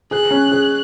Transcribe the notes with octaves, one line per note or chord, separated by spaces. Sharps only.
G#4 F#6
C#4
G#4